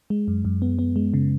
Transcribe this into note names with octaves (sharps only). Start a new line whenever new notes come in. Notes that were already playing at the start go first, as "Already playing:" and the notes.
G#3
F#2
F#2
B3
B3
G#3
C#3